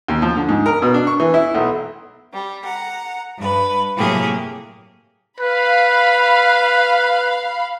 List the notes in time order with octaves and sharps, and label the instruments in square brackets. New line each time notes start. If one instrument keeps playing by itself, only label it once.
[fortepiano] D#2
F3
D3
G#2
A#4
B2
D4
C#6
E3
E4
B1
[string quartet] G3
F#5 A#5
G2 B4
A2 C3 F#3 A#3 G4 G#4
[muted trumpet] B4 [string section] F5 B5